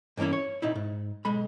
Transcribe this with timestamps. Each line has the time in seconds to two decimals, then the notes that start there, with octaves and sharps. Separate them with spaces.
0.17 G2 E3 A#3 C#4 E4
0.33 C#5
0.62 A#2 D#4 E4
0.75 G#2
1.25 B1 G#3 B5